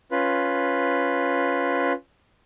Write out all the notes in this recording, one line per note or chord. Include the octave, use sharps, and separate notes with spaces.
C#4 F4 B4